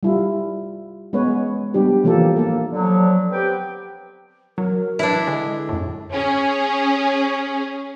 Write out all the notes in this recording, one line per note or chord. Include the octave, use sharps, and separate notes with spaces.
G3 E4 F4
G#3 B3 C#4 B4 C#5
G3 B3 D4 G4
E3 F3 A#3 G4 A4
A#3 A4
D3 F3 F#3
B3 C4 G4 B4 G5
F#3 A#4
D4 E4 B4
D3 G#3
F#2 A2
C#4 G#4